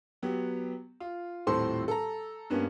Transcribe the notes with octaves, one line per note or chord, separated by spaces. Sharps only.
F#3 B3 G4
F4
D#1 A2 C4 A4 C5 C6
A4 A#5
G2 A#3 B3 C#4